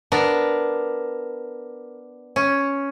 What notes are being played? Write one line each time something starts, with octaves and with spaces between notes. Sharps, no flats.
B3 D4 A#4
C#4